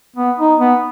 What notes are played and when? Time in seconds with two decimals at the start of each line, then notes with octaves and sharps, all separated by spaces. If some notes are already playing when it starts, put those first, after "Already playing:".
0.16 B3
0.39 D#4
0.60 B3